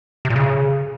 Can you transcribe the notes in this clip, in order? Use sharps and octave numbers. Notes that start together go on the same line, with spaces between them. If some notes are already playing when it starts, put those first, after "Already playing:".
C3
A#2
C#3